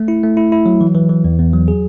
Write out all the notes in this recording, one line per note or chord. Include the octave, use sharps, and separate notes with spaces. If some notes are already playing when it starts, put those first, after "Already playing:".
Already playing: A3
E4
A3
E4
E4
F#3
E3
E3
E3
E2
E2
F#3
G#4